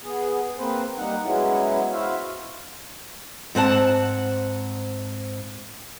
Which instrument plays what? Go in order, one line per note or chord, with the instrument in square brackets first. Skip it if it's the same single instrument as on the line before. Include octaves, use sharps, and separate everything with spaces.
[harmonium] B3 G#4
A#3 C4 B4 C5
G3 A#3 D#4 F#5
F#3 G#3 B3 C#4 E4
E4 F#4 C5 E5 F5
[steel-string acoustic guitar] G#2 C4 F#5 A5